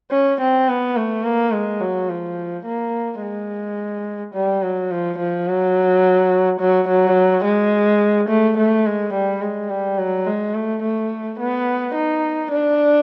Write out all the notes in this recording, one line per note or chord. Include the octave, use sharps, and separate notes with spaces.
C#4
C4
B3
A3
A#3
G#3
F#3
F3
A#3
G#3
G3
F#3
F3
F3
F#3
F#3
F#3
G#3
A3
A3
G#3
G3
G#3
G3
F#3
G#3
A3
A3
B3
D#4
D4